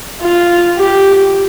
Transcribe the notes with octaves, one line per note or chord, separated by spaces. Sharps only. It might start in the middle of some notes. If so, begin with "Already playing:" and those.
F4
G4